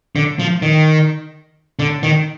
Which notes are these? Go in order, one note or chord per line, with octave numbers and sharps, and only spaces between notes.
D3
F3
D#3
D3
D#3